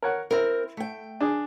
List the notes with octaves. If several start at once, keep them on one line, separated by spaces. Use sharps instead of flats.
A#4 C#5 F#5
C4 E4 A#4
A3 G5
D4 G#4